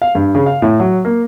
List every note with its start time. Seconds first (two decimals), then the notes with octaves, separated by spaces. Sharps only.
0.02 F5
0.15 G2
0.35 C#3
0.46 F5
0.62 A2
0.80 F#3
1.05 A#3